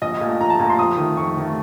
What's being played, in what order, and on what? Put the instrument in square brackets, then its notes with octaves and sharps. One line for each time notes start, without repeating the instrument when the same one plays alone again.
[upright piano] A#1 D#5
A#2 A3
A#1 A#5
A5
A#2 A3 A#5
C6
F2 D#6
D#3 A3
F2 C#6
D#3 A3